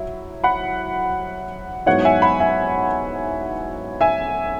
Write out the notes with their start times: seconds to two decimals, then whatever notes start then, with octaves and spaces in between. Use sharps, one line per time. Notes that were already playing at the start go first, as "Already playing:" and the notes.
Already playing: F#3 E4
0.44 F#5 B5
1.86 G#2 F#3 B3 E4 C#5 F#5
2.05 E5 G#5
2.22 F#5 B5
2.40 E5 G#5
4.01 E5 G#5